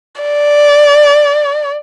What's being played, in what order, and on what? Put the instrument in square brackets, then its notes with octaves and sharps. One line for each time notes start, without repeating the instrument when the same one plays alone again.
[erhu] D5